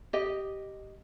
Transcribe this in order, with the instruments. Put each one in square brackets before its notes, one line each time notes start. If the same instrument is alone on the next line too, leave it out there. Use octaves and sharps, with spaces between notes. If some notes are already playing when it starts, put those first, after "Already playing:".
[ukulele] G4 D#5